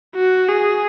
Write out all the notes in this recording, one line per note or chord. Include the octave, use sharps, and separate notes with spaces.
F#4
G#4